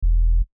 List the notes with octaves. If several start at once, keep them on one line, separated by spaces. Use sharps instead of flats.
E1